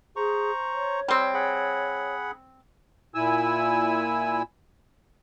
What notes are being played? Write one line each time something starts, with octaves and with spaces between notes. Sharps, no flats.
G#4 C5 A#5 C#6
C#5
G3 C4
G#4 F#5 B5
A#2 E4 G#5 E6